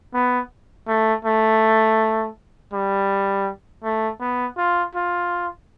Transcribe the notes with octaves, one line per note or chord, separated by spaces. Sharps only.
B3
A3
A3
G3
A3
B3
F4
F4